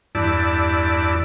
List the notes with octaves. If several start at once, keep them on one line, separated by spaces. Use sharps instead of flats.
E2 G2 E4 D5 A5